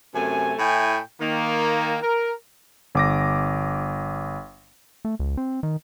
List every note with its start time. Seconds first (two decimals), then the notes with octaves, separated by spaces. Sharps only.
0.15 F#2 C3 A3 G#5
0.59 A2 E4 G5 G#5
1.21 D#3 A#3
2.02 A#4
2.95 G1 D6 A#6
5.05 A3
5.20 C#2
5.37 C4
5.63 D#3